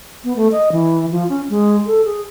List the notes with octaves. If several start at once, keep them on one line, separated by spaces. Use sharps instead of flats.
B3
A3
D#5
E3
F3
C#4
G#3
A4
G#4